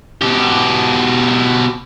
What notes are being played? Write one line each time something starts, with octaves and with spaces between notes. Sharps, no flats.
B2 G4